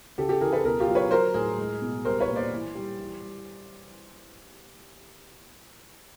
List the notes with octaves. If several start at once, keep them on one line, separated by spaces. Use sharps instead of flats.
C#3 G4 A4
G4 A4
E3 G#4 A#4
A4 B4
B2 G#4 A#4
F4 G4
F#3
B4 C#5
F#3 A#4 C5
A2 G#4 A#4
G#3
B2
G3 A#4 C5
B4 C#5
A#2
C5 D5
E3
G3
E3
G3